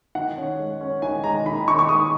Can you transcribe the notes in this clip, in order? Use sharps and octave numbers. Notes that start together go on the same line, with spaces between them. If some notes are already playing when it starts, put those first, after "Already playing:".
D#3 F#5
C#4
G#3
C#4
D#3 G#5
G#3 A#5
D#3 B5
D#3 C#6
C#6
G#3 D#6